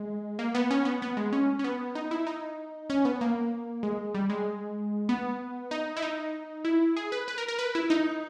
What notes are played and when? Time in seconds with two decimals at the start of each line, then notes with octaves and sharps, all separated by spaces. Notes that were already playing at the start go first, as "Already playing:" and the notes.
Already playing: G#3
0.39 A#3
0.55 B3
0.71 C#4
0.85 B3
1.02 B3
1.17 G#3
1.33 C#4
1.59 C#4
1.64 B3
1.95 D#4
2.11 E4
2.27 D#4
2.90 C#4
3.05 B3
3.21 A#3
3.83 G#3
4.15 G3
4.30 G#3
5.09 B3
5.71 D#4
5.97 E4
6.02 D#4
6.65 E4
6.96 G#4
7.12 B4
7.28 B4
7.38 A#4
7.48 A#4
7.59 B4
7.75 E4
7.90 D#4